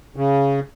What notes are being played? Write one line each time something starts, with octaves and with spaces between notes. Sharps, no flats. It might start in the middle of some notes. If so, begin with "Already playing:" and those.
C#3